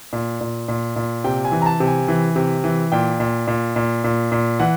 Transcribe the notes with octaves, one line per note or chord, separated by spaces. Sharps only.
A#2
A#2
A#2
A#2
C3 G5
G#5
E3
A#5
A5
C3
G#5
E3
C3
E3
A#2 G5
A#2
A#2
A#2
A#2
A#2
E3 F#5